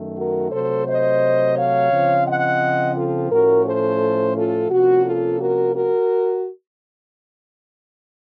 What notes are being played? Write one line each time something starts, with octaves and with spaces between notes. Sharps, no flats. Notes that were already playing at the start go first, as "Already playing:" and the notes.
Already playing: F#2 D#3 A3
F#4 A#4
C3 F#3 A3 A4 C5
C5 D#5
C#5 F5
C#3 F3 C4
D#5 F#5
F4 A4
A2 F3 A3 C#4 F#4 A#4
A4 C5
F4 A4
C3 F3 A#3 C#4 F4 F#4
F4 A4
F#4 A#4
F#4 A#4